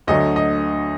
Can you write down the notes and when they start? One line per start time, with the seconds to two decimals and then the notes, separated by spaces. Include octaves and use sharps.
0.07 D2 D3 F#3 A3 D#5
0.36 D#5